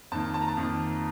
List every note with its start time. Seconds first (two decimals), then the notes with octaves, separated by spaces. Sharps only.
0.12 F2 D#3 A#3 A5
0.34 A5
0.41 A#5
0.48 A5
0.57 F2 D#3 A#3